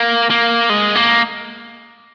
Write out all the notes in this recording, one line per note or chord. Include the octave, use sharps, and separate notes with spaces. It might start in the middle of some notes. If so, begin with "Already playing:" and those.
Already playing: A#3
A#3
G#3
A#3